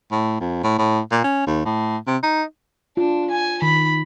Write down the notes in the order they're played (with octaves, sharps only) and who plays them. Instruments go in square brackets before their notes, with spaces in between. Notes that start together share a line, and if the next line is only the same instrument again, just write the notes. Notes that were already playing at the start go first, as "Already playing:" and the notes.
[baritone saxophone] A2
F2
A2
A2
A#2
C#4
D#2
A2
C3
D#4
[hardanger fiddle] D4 [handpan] F4
[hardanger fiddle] G#5
[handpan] D#3 [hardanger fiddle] B5